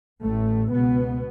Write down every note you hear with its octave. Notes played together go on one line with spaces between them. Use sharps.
A1 A2 A3
C#2 B2 B3